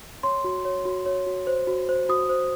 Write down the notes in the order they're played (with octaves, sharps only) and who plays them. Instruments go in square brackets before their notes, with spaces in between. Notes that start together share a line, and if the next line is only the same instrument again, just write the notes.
[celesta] C#5 C6
F#4
C#5
F#4
C#5
F#4
C5
F#4
C5
F#4 D#6
C5